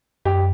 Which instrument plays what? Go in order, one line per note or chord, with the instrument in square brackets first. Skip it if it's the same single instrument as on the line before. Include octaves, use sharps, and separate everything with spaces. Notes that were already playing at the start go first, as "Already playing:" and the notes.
[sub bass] F#2 [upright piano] G4